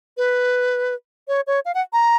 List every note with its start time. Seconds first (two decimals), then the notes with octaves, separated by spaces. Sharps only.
0.17 B4
1.28 C#5
1.47 C#5
1.65 F5
1.74 F#5
1.93 A#5